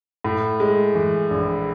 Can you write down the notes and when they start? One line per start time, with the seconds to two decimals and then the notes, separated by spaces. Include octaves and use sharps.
0.24 A2
0.60 G#3
0.95 E3
1.31 A#1